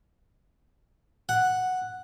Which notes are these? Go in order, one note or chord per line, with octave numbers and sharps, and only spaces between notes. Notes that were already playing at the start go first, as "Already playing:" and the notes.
F#5